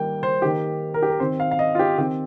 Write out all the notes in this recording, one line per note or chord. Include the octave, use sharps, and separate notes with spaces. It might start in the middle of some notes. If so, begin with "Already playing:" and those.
Already playing: D#3 G3 A#3 G5
C5
D#3 A#3 G4
A#4
G4
A#4
D#3 C4 C5
F5
F5
D#5
F4
G4
D#3 C4 G4